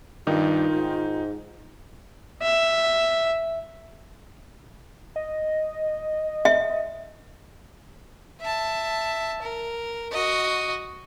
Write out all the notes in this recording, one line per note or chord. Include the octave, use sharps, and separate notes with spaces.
G2 D#3 D#4 F4
G#2
E5
D#5
E5
E5 A5
A#4
F#4 D#5